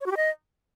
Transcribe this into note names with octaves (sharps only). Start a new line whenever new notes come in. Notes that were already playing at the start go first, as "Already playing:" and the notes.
C#5
F#4
G4
D#5